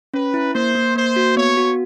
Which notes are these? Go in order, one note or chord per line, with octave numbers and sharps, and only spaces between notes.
C#4 B4
E4
A#3 C5
A#3
A#3 C5
F#4
B3 C#5
F#4